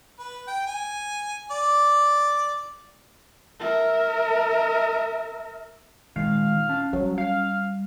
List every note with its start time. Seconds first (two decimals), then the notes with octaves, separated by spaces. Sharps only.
0.19 B4
0.47 G5
0.67 G#5
1.51 D5
3.60 A#4 E5
6.16 A#2 D#3 G#3 F5
6.69 C#4 A5
6.93 F#3 G3
7.18 F5